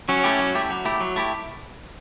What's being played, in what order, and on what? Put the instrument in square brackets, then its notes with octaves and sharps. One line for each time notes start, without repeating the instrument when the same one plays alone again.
[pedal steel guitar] F#3 [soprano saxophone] C#4
[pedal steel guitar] A3 E4 G4
F#3
A3 E4 G4
F#3
A3 E4 G4
F#3
A3 E4 G4